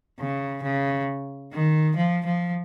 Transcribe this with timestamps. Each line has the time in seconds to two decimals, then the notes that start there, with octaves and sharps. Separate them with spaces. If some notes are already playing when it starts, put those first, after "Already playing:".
0.19 C#3
0.62 C#3
1.52 D#3
1.96 F3
2.26 F3